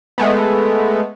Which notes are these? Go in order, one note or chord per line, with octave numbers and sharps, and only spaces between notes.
G#3 A3 B3